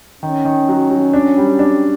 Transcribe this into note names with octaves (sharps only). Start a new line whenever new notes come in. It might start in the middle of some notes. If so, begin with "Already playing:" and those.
D#3 C#4
D#3
F#3
F#3
D4
G3
D4